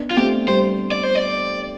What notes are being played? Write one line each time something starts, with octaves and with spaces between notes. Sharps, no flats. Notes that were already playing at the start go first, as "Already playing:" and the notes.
Already playing: B3 D4
F4
A3 C4 G4
G3 C5
D5
C5
D5